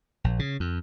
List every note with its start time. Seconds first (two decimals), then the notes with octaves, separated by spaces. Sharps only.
0.24 A#1
0.39 C#3
0.60 F2